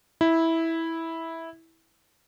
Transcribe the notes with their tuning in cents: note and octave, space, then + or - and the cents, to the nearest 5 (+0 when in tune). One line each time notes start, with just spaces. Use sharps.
E4 -10